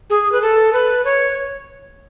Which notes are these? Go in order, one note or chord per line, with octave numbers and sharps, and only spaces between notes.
G#4
B4
A4
B4
C#5